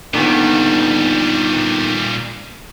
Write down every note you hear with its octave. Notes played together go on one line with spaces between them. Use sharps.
A#2 D3 D#3 G3 B3